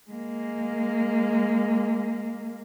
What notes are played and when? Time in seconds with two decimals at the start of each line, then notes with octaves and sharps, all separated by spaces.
0.10 G#3 A#3